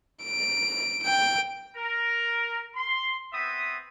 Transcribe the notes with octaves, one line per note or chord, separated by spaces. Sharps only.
D7
G5 D7
A#4
C6
B3 C4 E5 D#6